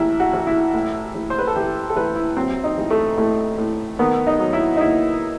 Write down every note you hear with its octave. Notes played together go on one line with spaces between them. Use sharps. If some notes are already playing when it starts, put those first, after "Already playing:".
Already playing: A1 E4
F#4
A1
E4
A2
A1
C5
B4
A4
A1 G4
A4
A1 B4
E4
F#3 C4
D#4
A1
A3
A2 A3
A2
D#3 B3
D#4
F#3
E4
D#4
D#2 E4